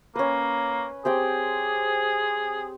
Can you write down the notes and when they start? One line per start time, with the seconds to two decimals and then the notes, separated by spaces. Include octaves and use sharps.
0.15 A#3 C#4 B4
1.05 C4 G4 G#4 G5